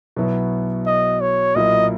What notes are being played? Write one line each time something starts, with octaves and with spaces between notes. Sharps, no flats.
B1 B2 F#3 B3 E4
D#5
C#5
B1 A#2 A#3 E4 D#5